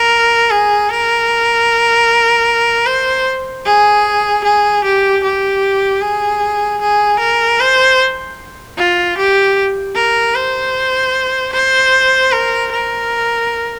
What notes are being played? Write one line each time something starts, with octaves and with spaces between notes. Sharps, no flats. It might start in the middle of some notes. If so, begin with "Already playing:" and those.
Already playing: A#4
G#4
A#4
C5
G#4
G#4
G4
G4
G#4
G#4
A#4
C5
F4
G4
A#4
C5
C5
A#4
A#4